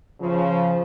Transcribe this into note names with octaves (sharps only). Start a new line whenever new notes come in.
C#3 F3